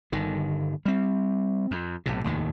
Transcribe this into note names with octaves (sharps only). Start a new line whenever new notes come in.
G1 D3 D#3
G3 C4
F2
B1 A2 C3
F1 D#2 A2 D#3